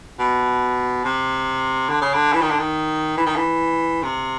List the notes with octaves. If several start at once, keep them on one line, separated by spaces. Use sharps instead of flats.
B2
C3
D3
C#3
D3
E3
D#3
D3
D#3
E3
D#3
E3
C3